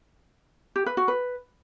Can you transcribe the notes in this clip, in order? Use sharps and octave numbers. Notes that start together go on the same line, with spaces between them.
G4
B4
F#4
B4